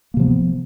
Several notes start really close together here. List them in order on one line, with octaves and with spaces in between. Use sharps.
A#3 C3 F3 B3